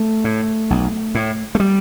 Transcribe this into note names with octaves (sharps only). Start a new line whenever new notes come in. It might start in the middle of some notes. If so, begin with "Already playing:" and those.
Already playing: A3
A2
B1
A2
A3
G3